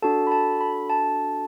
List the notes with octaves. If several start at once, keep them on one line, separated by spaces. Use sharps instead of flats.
D4 F#4 A4 A5
B5
A5
B5
A5